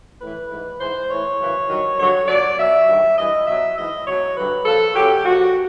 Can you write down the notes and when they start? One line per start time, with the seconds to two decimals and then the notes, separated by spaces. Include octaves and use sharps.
0.20 A2 E3 B4
0.50 G#2 E3
0.79 G#2 E3 C5
1.09 A2 E3 C#5
1.39 F#2 C#3 E3
1.69 G2 D#3 F#3
1.98 G2 D3 F#3 C#5
2.28 A#2 F#3 D5
2.57 B2 F#3 E5
2.87 G2 D#3 F#3
3.17 G2 E3 D#5
3.46 B2 F#3 E5
3.76 G#2 E3 D#5
4.06 B2 F#3 C#5
4.35 G2 D3 F#3 B4
4.65 A#2 F3 A4
4.95 F#2 C#3 F#3 G4
5.25 A#2 F3 F#4